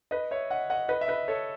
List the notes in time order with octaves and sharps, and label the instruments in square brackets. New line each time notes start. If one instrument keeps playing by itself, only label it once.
[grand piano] B4 D#5
C#5 E5
D#5 F#5
D#5 F#5
B4 D#5
E5
B4 D#5
A4 C#5